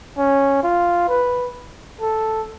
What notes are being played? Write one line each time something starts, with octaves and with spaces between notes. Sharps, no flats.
C#4
F4
B4
A4